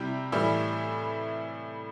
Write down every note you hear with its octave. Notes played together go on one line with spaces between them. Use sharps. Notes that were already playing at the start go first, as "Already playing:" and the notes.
Already playing: C3 G3 E4 G4
A2 E3 G3 E4